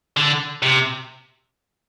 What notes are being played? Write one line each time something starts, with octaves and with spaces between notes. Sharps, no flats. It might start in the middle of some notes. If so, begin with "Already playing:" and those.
D3
C3